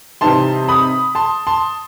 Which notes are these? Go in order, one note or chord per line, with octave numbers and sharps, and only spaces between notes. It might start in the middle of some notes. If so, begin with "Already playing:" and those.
C3 E3 G3 C4 D#4 A5 C6
B5 D#6
A5 C6
A5 C6